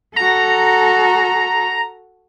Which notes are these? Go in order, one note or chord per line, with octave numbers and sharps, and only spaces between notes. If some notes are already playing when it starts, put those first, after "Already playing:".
F#4 A4 A#5